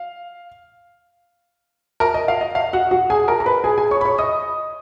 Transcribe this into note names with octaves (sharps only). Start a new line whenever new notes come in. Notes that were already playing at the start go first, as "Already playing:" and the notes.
Already playing: F5
A#4 A#5
D#5
F5
D#5
F5
F#4 F#5
F#4 F#5
G#4 G#5
A#4 A#5
A#5
B4 B5
G#4 G#5
G#4 G#5
C#5 C#6
B5
C#5 C#6
D#5 D#6